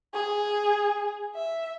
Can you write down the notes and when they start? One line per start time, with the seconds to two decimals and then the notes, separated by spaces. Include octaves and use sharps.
0.14 G#4
1.35 E5